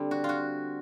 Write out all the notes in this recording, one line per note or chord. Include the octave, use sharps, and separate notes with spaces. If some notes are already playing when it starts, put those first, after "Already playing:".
Already playing: D3 G3 C4
F#4
F4
F#4